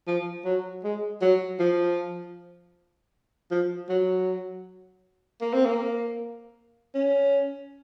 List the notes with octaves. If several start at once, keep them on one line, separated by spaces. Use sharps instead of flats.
F3
F#3
G#3
F#3
F3
F3
F#3
A#3
C4
A#3
C#4